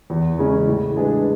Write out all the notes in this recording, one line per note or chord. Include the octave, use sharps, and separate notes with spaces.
E2
C#3 E3 G#3 C#4
A2
G#3 D4 G#4 B4